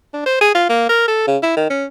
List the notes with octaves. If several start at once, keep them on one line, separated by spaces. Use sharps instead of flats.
D4
C5
G#4
F4
A#3
A#4
A4
C#3
E4
D#3
C#4